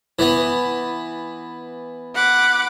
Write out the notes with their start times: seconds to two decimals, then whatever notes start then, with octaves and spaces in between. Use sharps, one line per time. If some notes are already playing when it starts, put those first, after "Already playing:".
0.19 E3 B3
2.14 F#5 B5 D6